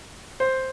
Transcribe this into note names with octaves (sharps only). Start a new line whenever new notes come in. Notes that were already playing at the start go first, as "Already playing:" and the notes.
C5